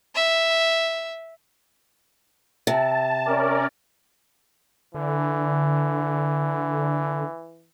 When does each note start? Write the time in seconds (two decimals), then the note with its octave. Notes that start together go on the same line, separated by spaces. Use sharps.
0.16 E5
2.67 C3 A5
3.26 C#4 A#4 D5
4.95 D3 E3